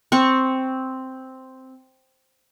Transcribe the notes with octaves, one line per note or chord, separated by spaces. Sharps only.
C4 C#6